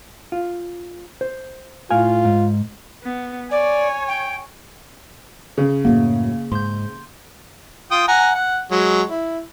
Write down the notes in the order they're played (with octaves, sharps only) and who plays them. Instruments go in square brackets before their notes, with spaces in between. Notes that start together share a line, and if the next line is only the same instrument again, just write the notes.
[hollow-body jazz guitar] F4
C5
[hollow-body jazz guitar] A2 F5 G#5 [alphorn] F4
[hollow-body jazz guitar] G#2
[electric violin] B3
[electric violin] C#5 G#5 [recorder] D5
[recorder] G5
[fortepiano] C#3
[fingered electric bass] F#2 A2 F#3 [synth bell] A#3
[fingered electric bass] G#2 [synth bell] C6 G6
[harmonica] F4 G5 D#6
F#5 G#5 A#5
F#5
F#3 G#3
E4